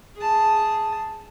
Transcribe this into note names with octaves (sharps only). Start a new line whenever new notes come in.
G#4 A5